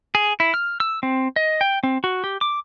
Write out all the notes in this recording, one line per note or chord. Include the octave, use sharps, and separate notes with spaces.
G#4
E4
F6
E6
C4
D#5
G5
C4
F#4
G4
D6